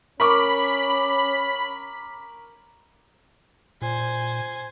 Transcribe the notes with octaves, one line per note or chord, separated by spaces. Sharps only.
C#4 A#4 B5 C#6 D6
A#2 C5 G#5